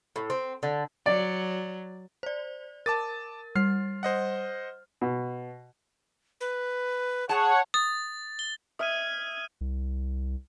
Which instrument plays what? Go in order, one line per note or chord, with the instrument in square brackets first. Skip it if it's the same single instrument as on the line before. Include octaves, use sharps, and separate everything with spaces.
[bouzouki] A2
C4
D3
[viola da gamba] F#3 [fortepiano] D5
[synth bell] C5 D5
[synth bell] A#4 [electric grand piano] A5 D6 A6
[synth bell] G3 [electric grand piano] F6 C7
[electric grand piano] C5 D#5 F#5
[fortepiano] B2
[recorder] B4
[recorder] G#4 [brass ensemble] C#5 F#5 [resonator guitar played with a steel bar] A5
[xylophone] D#6 [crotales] A6
[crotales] G7
[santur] E5 [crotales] D#6 F6 D#7 [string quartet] G#6
[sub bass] C2